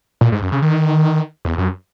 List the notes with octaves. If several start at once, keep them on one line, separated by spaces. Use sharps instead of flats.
A#2
G#2
F#2
C#3
D#3
E2
F#2